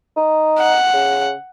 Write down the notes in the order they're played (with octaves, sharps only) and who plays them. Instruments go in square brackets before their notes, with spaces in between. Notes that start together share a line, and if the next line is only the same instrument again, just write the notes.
[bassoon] D#4
[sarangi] F#5
[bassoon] C#3